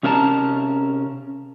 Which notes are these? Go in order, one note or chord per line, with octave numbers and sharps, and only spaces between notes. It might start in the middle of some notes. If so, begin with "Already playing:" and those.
C3 C#4 A#4 C#5 A5 A#5